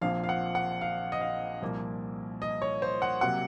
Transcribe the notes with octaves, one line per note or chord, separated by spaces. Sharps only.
A#1 A#2 F3 C4 F5
F5
F#5
F#5
F5
D#5
F5
C2 A#2 F3 A#3
D#5
C#5
C5
F#5
C3 F#3 A#3 F#5